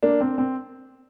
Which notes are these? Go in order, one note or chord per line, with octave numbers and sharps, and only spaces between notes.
A#3 D4
C4
C4